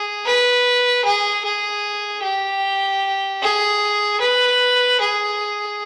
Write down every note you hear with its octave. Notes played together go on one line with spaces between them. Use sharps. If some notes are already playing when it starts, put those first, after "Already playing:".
Already playing: G#4
B4
G#4
G#4
G4
G#4
B4
G#4